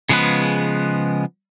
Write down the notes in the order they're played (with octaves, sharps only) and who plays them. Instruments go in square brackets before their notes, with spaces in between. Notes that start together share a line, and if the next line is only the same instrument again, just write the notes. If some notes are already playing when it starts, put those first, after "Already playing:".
[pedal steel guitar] C#3 F3 G#3 B3 B4